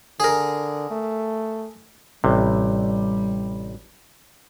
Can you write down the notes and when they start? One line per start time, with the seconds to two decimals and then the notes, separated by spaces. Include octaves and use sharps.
0.20 D3 G#4 A#4
0.91 A3
2.24 A1 C3 G3